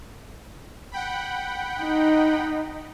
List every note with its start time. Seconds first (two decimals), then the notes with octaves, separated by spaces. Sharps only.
0.92 F#5 G5 B5
1.81 D#4